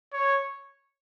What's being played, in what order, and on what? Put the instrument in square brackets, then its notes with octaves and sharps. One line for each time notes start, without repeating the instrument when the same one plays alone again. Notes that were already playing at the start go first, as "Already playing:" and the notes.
[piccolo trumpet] C#5